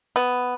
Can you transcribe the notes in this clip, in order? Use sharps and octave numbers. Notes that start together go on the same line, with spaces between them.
B3